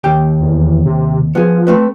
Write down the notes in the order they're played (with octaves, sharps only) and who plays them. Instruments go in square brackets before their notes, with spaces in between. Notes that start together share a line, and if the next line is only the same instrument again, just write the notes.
[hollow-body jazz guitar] D#2 G4 G5
[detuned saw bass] E2
C3
[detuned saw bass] F3 [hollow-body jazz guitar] B3 G#4
[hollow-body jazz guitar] A3 C4 B4